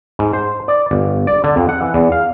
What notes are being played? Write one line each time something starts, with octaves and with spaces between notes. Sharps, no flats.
G#2
C5
D5
G1
D5
D3
F2
F#5
E3
E2
F5